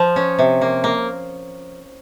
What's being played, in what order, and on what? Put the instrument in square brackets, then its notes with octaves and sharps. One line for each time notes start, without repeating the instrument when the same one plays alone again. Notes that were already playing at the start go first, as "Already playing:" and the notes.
Already playing: [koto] F3
C#4
C3
A#3
A#3